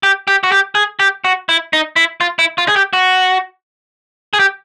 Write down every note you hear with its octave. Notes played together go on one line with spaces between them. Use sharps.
G4
G4
F#4
G4
G#4
G4
F#4
E4
D#4
E4
F4
E4
F4
G#4
G4
F#4
G#4
G4